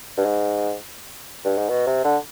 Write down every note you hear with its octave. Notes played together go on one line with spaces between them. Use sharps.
G2
G#2
G2
G#2
B2
C3
D3